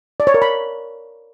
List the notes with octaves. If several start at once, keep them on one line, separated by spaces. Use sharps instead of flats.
D5
C#5
A#4
B5